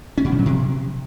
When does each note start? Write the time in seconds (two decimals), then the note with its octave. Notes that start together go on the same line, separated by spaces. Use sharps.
0.18 C#4
0.25 B2
0.32 F3
0.39 F#3
0.46 C3